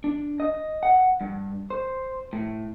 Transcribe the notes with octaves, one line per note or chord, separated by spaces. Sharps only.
D4
D#5
F#5
G2
C5
A2